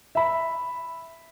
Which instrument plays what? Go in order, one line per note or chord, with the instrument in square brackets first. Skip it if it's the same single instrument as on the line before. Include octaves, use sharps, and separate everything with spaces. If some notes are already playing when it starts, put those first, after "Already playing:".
[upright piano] E5 B5